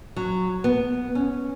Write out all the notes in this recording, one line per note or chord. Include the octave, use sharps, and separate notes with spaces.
F#3
B3
C#4